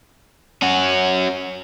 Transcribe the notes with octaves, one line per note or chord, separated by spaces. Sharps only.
C#4 F#4